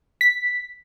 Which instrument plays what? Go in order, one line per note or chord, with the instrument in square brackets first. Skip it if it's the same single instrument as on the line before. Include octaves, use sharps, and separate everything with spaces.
[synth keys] B6